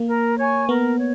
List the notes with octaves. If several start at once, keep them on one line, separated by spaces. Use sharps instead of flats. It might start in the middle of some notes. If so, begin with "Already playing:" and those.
Already playing: A#3
A#4
C#5 G#5 C#6
B3 A#4
C#5